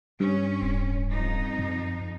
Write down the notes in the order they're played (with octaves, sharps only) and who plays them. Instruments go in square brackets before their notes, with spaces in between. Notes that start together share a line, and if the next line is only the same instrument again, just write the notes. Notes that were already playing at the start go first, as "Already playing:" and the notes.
[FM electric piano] G2 [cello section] C#4
[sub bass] D1
[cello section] F2 D#4
[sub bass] F#2